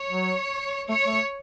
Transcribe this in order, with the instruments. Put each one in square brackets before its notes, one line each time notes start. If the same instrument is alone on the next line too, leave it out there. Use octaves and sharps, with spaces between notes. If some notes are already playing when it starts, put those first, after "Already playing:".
Already playing: [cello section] C#5
[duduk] F#3
[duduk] A3 [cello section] C#5
[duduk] A3